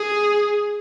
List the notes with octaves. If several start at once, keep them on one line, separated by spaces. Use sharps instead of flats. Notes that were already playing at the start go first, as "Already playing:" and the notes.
Already playing: G#4